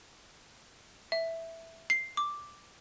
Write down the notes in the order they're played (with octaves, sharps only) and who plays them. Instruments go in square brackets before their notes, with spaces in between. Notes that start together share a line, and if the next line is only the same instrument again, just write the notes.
[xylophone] E5
C7
D6